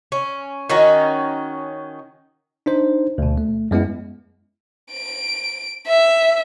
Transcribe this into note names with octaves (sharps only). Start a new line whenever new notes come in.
C#4
D#3 C#4 D#4 F#4
D4 D#4 C5
D2 B2
A3
F#2 G#3 B3 E4
D7
E5